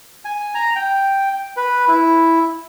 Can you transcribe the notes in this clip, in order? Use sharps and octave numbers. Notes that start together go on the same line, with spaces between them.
G#5
A#5
G5
B4
E4